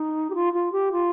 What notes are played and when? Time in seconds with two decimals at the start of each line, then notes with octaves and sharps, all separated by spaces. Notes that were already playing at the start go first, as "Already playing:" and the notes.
Already playing: D#4
0.30 G4
0.34 F4
0.53 F4
0.72 G4
0.92 F4